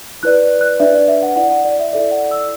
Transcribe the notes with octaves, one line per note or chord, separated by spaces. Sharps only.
E4 B4 D5 F#6
F#6
D4 B4 D5 E5
D5
E5
F#5
E4 D5 F#5
F#5
D5
E5
E4 A4 D5 E5
F#5
E6